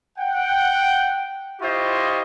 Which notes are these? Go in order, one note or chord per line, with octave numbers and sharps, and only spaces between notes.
F#5 G5
E4 F4 G4 C5 D#5 C#6